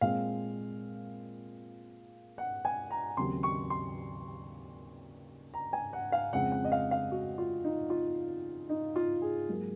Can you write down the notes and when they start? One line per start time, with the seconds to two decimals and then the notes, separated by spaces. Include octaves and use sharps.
0.01 A#2 G#3 C4 F5
2.38 F#5
2.65 G#5
2.91 A#5
3.17 D#2 C#3 F#3 C4 C6
3.43 C#6
3.70 C6
5.54 A#5
5.73 G#5
5.93 F#5
6.12 F5
6.33 F2 C#3 G#3 C4 F#5
6.52 F#5
6.64 D#5
6.72 F5
6.91 F5
7.11 F#4
7.38 F4
7.64 D#4
7.90 F4
8.69 D#4
8.96 F4
9.22 G#4
9.49 G#2 F#3 A#3